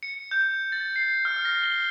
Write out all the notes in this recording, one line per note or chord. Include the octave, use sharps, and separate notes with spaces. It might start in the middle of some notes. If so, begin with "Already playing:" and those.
C#7
G6
A6
C7
F6
A#6
G7